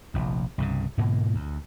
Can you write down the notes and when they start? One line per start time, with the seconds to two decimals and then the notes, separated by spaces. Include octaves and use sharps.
0.14 F1 A#1 F2
0.58 C2 G2 C#3
0.98 G#2 B2 D3 A#3
1.35 D2